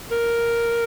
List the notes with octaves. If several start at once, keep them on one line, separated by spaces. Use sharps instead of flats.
A#4